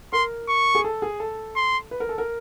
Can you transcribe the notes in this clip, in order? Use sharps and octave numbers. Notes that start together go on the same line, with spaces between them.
A#4 C6
C#6
G#4
A4
G#4
A4
C6
B4
A#4
A4
A#4